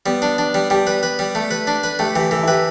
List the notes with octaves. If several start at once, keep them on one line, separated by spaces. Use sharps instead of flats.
G3 B3
D4
D4
G3
G3 G4
B4
B4
G3
A3
B4
D4
B4
A3 G4
E3 G4
E3 A4
E4
G4 B4